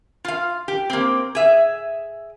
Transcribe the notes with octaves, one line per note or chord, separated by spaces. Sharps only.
F4 F5
G4
A#3 C4
G#4 E5